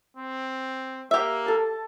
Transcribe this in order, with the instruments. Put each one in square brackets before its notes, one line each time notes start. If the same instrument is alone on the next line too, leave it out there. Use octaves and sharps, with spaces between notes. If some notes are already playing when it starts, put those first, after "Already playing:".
[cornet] C4
[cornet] A#3 [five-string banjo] G4 E5
[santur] A4 A5